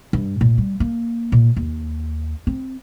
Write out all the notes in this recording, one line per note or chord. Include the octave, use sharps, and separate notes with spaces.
G2
A#2
G3
A#3
A#2
D#2
C4